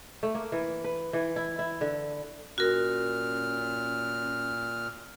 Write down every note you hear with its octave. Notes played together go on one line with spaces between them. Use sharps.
A3
A#3
E3
B4
E3
E4
E4
D3
A#2 C#4 F#4 A#4 F6